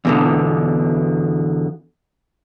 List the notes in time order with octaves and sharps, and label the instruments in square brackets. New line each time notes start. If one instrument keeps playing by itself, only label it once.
[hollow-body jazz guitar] E2 B2 D3